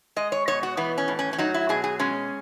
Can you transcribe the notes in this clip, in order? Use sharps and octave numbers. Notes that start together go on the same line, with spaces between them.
G#3 D#5
C#5
B2 C#5
F#4
E3 B3
C#4
A2
C#4
C#4
F#3 D#4
E4
B2 G#4
G#4
G#3 C#4